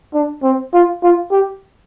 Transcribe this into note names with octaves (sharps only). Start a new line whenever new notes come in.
D4
C4
F4
F4
G4